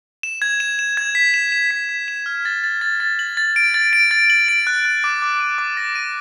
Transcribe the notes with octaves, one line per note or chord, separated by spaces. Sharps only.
E7
G#6
E7
E7
G#6
B6
E7
E7
B6
B6
E7
F6
A6
A6
A6
A6
F#7
A6
D7
A6
D7
A6
F#7
D7
F#6
F#6
D6
D6
D#7
D6
A#6
D#7